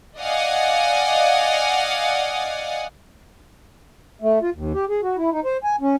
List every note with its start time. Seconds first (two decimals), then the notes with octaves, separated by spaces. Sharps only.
0.19 D5 D#5 F5 F#5 G#5
4.22 A3
4.42 F4
4.55 D#2
4.73 G4
4.89 G#4
5.03 F#4
5.17 E4
5.32 D#4
5.45 C5
5.64 G#5
5.81 C#4